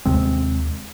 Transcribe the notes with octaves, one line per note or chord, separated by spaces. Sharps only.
D#2 C3 G#3 C4